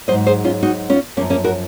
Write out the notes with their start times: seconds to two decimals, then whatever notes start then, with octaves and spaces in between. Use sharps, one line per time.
0.08 F#3 C5 D#5
0.12 G#2
0.26 G#4 C5
0.44 C#4 F4
0.63 D#4 F#4
0.90 C#4 F4
1.17 F3 A#3 C#4
1.21 F#2
1.30 A#3 C#4
1.44 F#4 A#4